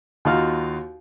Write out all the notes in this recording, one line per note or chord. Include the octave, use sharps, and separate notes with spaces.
D#2 D#4 F4 F#4 F5 F6